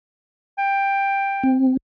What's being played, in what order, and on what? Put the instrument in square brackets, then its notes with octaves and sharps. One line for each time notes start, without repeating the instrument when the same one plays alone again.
[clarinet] G5
[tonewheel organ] C4